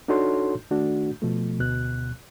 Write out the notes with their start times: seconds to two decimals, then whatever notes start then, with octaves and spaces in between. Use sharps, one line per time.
0.08 D4 D#4 F#4 A4 C#5 C6
0.71 D#3 A3 D4 F#4
1.22 B2 F3 A3
1.59 D2 B2 F#6